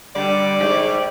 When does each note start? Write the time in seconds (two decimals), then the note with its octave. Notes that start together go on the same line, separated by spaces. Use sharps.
0.15 D3 G3 D5
0.60 G#2 G4